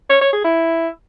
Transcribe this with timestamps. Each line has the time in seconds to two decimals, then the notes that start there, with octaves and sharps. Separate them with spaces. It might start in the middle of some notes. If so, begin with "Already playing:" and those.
0.10 C#5
0.21 C#5
0.33 G#4
0.45 E4